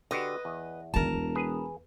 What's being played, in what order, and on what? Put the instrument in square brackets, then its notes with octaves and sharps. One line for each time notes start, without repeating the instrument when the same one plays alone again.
[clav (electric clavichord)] D3 F#4 G4 [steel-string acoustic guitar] B4 D#5
[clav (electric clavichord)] E2
[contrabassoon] E1 [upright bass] F#2 D#3 [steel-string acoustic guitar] A#4 A5
[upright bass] E2
[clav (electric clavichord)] G#4 B4